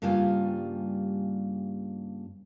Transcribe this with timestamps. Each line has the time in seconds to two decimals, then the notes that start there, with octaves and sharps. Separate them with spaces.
0.02 G2 C#3 G3 A#3 F4 G#5